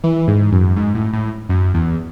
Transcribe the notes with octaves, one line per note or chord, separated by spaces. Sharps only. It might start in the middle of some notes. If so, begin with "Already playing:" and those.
E3
G#2
F#2
G#2
A2
A2
F#2
E2